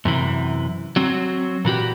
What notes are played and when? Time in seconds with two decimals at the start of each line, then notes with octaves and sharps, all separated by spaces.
0.05 F#2 C3 E3
0.96 F#3 C4
1.65 A#2 E3 F#4 G4